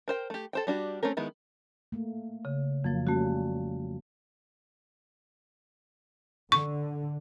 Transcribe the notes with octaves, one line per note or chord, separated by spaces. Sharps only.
A#4 C5 G5
A3 G4
A4 C5 G5
G3 D4 F#4 G4
A3 C4 C#4 A#4
D#3 G#3 B3 E4
A3 A#3
C#3
F2 F3 F#3 A#3
G3 A3 A#3 C#4 F#4
D3 C#6